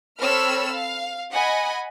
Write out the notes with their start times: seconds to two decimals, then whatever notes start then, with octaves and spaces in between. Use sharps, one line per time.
0.21 C4 A4 C#5 B5 E6 F6
0.74 F5
1.32 D#5 F#5 G#5 B5